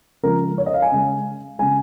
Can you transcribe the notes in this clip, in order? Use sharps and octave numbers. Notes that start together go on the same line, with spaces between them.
C#3 F3 G#3 A#4
C#5
D#5
F5
G#5
C#3 G#3
C#3 G#3 G#5